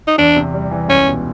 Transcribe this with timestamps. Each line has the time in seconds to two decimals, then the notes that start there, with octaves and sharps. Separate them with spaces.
0.07 D#4
0.18 E2 D4
0.36 C3
0.54 G3
0.71 E3
0.88 C#2 C#4
1.07 B2